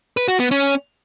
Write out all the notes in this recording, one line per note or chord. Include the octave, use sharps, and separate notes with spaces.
B4
F#4
B3
C#4